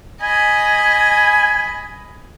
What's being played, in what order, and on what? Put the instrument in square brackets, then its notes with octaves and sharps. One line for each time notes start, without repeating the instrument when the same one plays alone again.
[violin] D#5 B5 [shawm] G#5